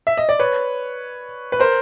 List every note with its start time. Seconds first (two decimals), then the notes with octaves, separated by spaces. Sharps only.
0.07 E5
0.17 D#5
0.29 D5
0.39 B4 C#5
1.52 B4
1.60 A#4 C5